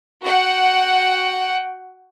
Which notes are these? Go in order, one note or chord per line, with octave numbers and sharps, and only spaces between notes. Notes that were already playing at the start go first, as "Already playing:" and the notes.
F#4 F#5 G5